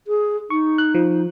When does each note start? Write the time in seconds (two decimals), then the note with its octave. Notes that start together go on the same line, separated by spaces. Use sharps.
0.07 G#4
0.50 D#4 C#6
0.78 F#6
0.94 F3